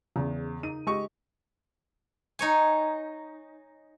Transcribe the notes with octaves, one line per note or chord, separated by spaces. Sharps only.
E2 C#3
D#4 D#7
G#3 G4 D#5 C#6
D#4 C#5 G#5